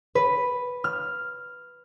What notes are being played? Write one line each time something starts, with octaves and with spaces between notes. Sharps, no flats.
B4
F6